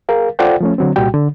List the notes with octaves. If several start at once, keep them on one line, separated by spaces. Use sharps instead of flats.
G#4 A#4 F5
F4 A4 C5 D5 F#5 G5
F3 A3 C#4
D3 F#3 C4
C2 A#2 G3 F#4 G5
D3